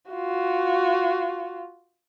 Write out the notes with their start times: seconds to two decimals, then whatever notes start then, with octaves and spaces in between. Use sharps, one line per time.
0.11 F4 F#4